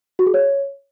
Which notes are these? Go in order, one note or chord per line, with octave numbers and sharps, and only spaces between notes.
F#4
G#4
C#5